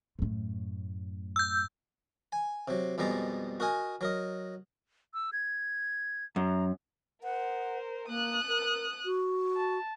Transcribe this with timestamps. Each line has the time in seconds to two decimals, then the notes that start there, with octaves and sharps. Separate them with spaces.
0.19 F#2 A2
1.36 E6 G6
2.32 G#5
2.68 C3 F#3
2.98 F2 B2 G3 G#3 A#5
3.60 F#4 A#4 D#5 G#5
4.01 F#3 A#4 D#5
5.14 E6
5.33 G#6
6.36 F#2 A#5
7.24 A#4 C5 F#5
8.08 A#3 D#6 F#6
8.48 A#4
9.05 F#4
9.56 A5